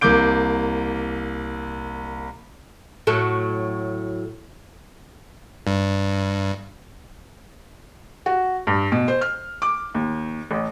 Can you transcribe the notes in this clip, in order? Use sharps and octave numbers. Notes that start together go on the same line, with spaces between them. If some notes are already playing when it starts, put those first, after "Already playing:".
C2 A#3 D6 G6 D7
A2 F#3 A4
G2
F#4
G2
B2
C5
F6
D6
D#2
A1